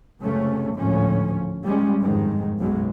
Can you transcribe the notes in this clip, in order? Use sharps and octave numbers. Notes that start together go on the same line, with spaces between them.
C#2 F#2 C3 A3 C#4
G#1 D2 A2 F3 C#4
G3 G#3 C#4
G1 F2 G#2 D#3 G#3
F#1 B1 F#2 B2 F#3 G#3